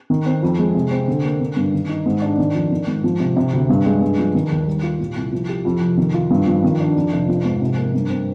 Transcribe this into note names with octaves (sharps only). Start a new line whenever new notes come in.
D#3
C4
F2
G#3
C3
C4
D3
A#3
D3
G2
D#3
D#4
G#2
D4
D#3
F2
D#3
G#2
F3
C3
C3
D2
G2
G#3
G2
F3
D#3
D#2
G3
F4
A#2
C2
F3
G4
F2
F1
D#3
F4
G2
F3
D#3
D4
F2
F1
F3
G#2
C3
A#3
G2
C4